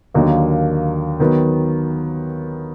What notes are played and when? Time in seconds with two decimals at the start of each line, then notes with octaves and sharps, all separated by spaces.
0.14 D#2 D3 F#3 A#3 D#4
1.20 D#3 F#3 B3